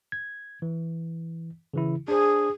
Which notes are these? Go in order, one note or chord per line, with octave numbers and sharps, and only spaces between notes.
G#6
E3
C#3 E3 E4
D4 G#4 C5